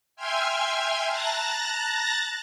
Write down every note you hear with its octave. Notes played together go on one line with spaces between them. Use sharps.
E5 G5 G#5 C6 F6 G#6
A5 A#5 F#6 A6 A#6